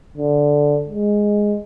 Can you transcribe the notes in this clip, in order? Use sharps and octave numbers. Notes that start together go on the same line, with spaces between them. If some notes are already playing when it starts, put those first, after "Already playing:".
D3
G#3